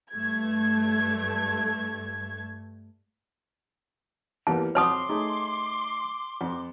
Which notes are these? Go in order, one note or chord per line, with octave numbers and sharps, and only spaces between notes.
G2 A3 G#6
E2 G3 A#3 A5
F2 F#4 C#5 A5 C6 D6 D#6 F6
A3 D#4 G#4
F2